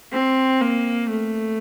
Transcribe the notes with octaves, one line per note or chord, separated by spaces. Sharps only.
C4
A#3
A3